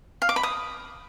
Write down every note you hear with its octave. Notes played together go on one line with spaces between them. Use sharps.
F5
D6
B5
D#6